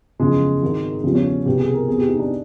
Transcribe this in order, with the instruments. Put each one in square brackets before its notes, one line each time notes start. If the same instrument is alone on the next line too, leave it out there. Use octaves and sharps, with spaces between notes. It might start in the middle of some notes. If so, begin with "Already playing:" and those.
[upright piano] F#1 E2 C#3 F3 G#3
G#1 G#2 D#3
E2 C#3 F3 G3
C#4
C2 B2 G4
G#4
A#4
E2 C3 E3 G#4
G4
D#4
D4